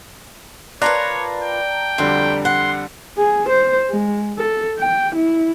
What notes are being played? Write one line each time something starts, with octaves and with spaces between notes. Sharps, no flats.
F4 A#4 B4 C#5 D5 A5 A#5 F#6
G5
F2 D3 G3 F4 F#4
F#5 C6
G#4
C5
G#3
A4
G5
E4